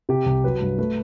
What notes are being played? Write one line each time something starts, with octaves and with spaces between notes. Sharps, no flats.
C3 G4
C2
F#3 B4
G2
A3 B4